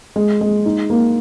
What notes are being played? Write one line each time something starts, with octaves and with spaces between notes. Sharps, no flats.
G#3
G#3
D#4
A#3